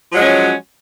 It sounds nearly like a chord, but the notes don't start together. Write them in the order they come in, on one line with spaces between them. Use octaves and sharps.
F3 F#3 G#3 F#4 C#4